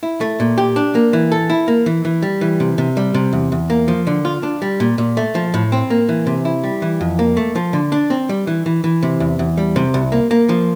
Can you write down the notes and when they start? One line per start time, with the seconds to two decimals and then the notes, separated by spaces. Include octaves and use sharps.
0.03 E4
0.21 A3
0.40 A#2
0.58 G4
0.76 D4
0.95 A#3
1.13 E3
1.32 A4
1.50 E4
1.68 A#3
1.86 E3
2.05 E3
2.22 G3
2.41 E3
2.60 C3
2.78 C3
2.97 G3
3.14 C3
3.33 E2
3.52 E2
3.70 A#3
3.88 F3
4.07 D3
4.25 F4
4.43 D4
4.62 G3
4.80 A#2
4.98 A#2
5.17 A3
5.35 F3
5.54 A2
5.72 C4
5.90 A#3
6.09 E3
6.27 C3
6.45 E4
6.64 G3
6.82 E3
7.01 F2
7.19 A#3
7.37 A3
7.56 F3
7.73 D3
7.92 D4
8.10 C4
8.29 G3
8.47 E3
8.66 E3
8.84 E3
9.03 C3
9.20 E2
9.39 E2
9.57 G3
9.76 C3
9.94 C2
10.12 A#3
10.31 A#3
10.49 F3